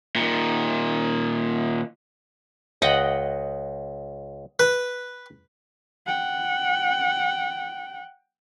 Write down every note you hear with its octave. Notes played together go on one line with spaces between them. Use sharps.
A#2 D#3
C#2 D#5 F#5 G5
B4
F#5 G5